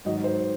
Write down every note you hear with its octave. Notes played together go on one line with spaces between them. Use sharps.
G#2 D#3 F#3 D#5
C5